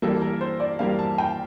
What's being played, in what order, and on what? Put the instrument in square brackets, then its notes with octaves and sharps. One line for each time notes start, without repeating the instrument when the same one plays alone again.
[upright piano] E3 G3 A#3 A4
A#4
C5
D5
E3 G3 A#3 F5
A5
G5